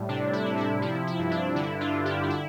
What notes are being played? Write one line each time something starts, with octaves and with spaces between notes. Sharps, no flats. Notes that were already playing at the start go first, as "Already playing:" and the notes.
Already playing: A2 G3
C3 D4
E4
C3
E4
F3 E4
E4
G2
D4
D3 E4
D4 F4
D3
E4 G4
D4
E4